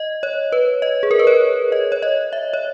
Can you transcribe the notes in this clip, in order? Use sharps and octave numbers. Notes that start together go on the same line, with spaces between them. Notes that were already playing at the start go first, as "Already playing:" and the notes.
Already playing: D#5
C#5
B4
D#5
G#4
A#4
B4
C#5
D#5
C#5
D#5
E5
C#5